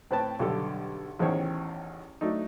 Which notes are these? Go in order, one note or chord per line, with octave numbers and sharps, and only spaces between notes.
A2 C4 B4 G5 A5
B1 G2 D3 G4 A4
A1 E2 D#3 C5 C#5 G5
F#3 A3 D4 D#4